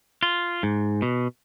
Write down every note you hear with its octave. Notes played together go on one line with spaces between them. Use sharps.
F4
G#2
B2